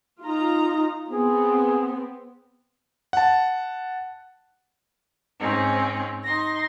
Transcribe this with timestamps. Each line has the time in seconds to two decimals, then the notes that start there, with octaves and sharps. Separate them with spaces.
0.22 D#4 F4 A#5
1.11 B3 C4 G#4
3.13 F#5 A5
5.39 G#2 C4 C#4 D#4
6.24 D#4 C6 A#6